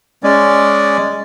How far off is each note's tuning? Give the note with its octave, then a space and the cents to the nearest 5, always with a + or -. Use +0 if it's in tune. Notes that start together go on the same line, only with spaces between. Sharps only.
G#3 +0 C#4 +0 D5 +0